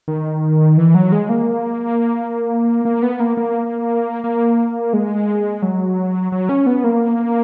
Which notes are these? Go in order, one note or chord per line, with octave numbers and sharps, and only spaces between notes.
D#3
E3
F#3
G#3
A#3
A#3
B3
A#3
A#3
A#3
G#3
F#3
F#3
C#4
B3
A#3